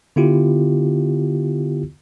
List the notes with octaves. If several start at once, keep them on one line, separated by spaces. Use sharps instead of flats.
D3 B3 E4 F4 G4